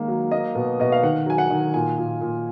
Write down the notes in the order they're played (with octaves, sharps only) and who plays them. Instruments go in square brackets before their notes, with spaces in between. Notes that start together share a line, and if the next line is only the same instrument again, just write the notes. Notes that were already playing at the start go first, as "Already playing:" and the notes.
Already playing: [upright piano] D#3 G#3 A#3
F#3
A#3 D#5
B2
B2 D#5
F5
D#3 F#5
F#3 G#5
F#5
D#3
A#2 G#5
A#2
A#2